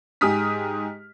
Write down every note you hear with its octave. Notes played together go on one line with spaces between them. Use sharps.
G#2 G4 G#4 D#6 F6 B6